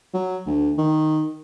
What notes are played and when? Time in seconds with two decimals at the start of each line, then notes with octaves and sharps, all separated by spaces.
0.14 F#3
0.46 D2
0.78 D#3